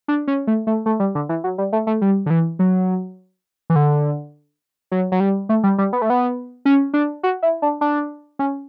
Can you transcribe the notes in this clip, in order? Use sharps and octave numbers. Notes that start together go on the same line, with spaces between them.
D4
C#4
A3
A3
A3
G3
D3
E3
F#3
G3
A3
A3
G3
D3
E3
F#3
E3
D3
F#3
F#3
G3
A3
G3
G3
B3
A3
B3
C#4
D4
F#4
E4
D4
D4
C#4